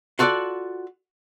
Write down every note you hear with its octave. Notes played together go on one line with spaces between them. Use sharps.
F4 F#4 A4 D5 F#5